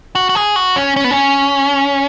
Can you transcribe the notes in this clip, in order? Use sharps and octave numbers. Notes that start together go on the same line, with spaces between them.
F#4
F#4
G#4
F#4
C#4
C#4
B3
C#4